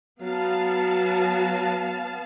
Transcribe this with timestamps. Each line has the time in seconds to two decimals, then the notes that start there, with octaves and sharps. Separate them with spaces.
0.21 F#3 B3 F5 A5